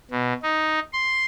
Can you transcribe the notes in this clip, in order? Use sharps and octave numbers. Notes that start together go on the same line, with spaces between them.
B2
D#4
C6